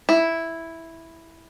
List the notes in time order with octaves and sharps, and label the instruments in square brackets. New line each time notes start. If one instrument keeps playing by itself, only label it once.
[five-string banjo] E4